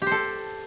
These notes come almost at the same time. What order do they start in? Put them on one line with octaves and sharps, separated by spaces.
G4 C5 A4